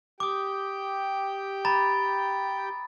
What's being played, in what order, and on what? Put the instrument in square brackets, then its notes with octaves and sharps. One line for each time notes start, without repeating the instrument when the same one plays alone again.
[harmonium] G4 G5 [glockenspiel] D6 D#6
[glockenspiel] A#5 B5 A6